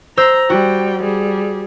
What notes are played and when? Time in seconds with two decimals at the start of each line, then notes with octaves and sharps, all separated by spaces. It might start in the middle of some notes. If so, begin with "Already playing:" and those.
0.17 C5 A#5 E6
0.50 G3 F#4 G5
1.03 G3 G#4